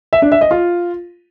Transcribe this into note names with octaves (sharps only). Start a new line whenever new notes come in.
E5
D4
E5
D#5
F4